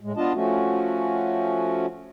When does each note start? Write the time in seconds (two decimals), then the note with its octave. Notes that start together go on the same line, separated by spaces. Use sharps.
0.01 A2 G#3
0.17 B3 D4 F4 D#5 A5
0.34 F3 A3 C#4 F#4